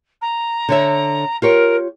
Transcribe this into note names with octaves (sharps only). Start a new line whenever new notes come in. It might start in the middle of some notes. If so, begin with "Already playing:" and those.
A#5
D3 C#5 E5
F4 G4 A#4 C#5